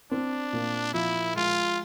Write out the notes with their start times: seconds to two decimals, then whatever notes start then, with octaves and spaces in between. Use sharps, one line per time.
0.11 C4 D4
0.53 A#2
0.94 F3 E4
1.36 G#3 F4